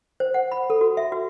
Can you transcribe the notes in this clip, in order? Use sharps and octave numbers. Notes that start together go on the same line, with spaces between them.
C5
F#5
B5
A4
F#4
E5
F#4